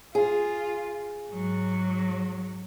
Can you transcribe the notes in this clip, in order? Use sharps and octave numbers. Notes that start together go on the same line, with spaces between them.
F4 G#4
G#2 F#3